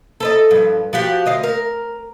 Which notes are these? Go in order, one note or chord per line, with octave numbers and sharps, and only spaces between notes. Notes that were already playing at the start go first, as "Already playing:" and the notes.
A4 B4 D#5
G2 F3
F3 F#4 G4
D2 D#5 F5
A#4